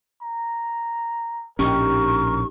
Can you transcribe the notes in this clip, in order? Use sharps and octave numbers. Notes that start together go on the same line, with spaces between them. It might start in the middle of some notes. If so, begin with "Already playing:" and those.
A#5
A#1 A2 C#4 D#4 G4 A#4 C#6